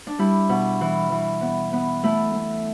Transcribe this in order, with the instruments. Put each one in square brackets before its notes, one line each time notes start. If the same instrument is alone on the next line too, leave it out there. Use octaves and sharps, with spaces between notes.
[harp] D4
G3 E4
B2
E3
E3
B3
B3
A3 E4 A4
A3